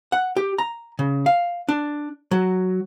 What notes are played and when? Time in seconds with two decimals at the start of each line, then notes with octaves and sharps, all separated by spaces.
0.12 F#5
0.36 G4
0.58 A#5
0.99 C#3
1.26 F5
1.69 D4
2.31 F#3